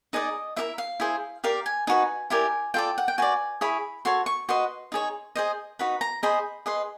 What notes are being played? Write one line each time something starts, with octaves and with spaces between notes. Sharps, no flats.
D#4 G#4 B4 D5 D#5
E4 G4 A#4 E5
F5
E4 G#4 C5
G4 A#4 D5 F5
G#5
D#4 F#4 B4 G#5
E4 G4 A#4 D5 G#5
F4 A4 D5 G5
F#5
G5
F#4 B4 D5 G#5
E4 G#4 C#5 B5
F#4 A4 C#5 C6
C#6
F#4 B4 D#5 C6
D#4 G#4 C#5
G#4 C5 D#5
D#4 F#4 B4 B5
A#5
G#4 C5 D#5 B5
G#4 B4 D#5 C6